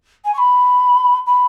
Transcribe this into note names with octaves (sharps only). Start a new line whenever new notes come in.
G#5
C#6
B5
B5